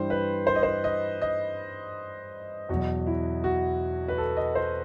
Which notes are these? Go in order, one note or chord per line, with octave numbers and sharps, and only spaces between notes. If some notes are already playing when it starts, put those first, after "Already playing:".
Already playing: G2 E3 G3 C5
B4
C5
D#5
C5
D#5
D#5
E2 B2 F#3 F#4
E4
F#4
B4
A4
D#5
C5